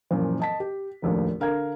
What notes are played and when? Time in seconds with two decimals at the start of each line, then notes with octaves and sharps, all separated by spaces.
0.11 F#2 A#2 E3 F3
0.40 D#5 A5 B6
0.60 G4
1.02 F1 A#1 D#2 A2
1.40 D3 A#4 F5 A#5 G#6